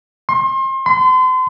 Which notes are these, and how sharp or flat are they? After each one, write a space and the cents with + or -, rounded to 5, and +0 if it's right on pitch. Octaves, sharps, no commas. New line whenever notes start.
C6 +30
C6 -40